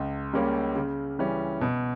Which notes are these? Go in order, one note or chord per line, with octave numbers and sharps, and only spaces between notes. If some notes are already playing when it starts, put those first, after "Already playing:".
Already playing: C#2
C#3 G3 A#3 C#4
C#3
E3 G3 C#4
B2